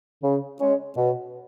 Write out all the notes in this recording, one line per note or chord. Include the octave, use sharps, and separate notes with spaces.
C#3
G#3 C#4
B2